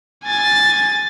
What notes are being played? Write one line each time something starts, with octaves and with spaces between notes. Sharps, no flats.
G#5 A6